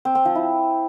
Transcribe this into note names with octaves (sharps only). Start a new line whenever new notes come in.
C4
C4
F3
E4